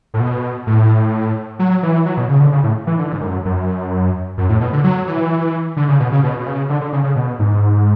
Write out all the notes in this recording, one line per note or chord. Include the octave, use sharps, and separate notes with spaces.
A2
B2
A2
F#3
E3
F#3
B2
C#3
D3
C#3
A2
E3
D3
G#2
F#2
F#2
F#2
A2
B2
D3
F#3
E3
D3
C#3
B2
C#3
B2
B2
C#3
D3
D3
C#3
C#3
B2
G#2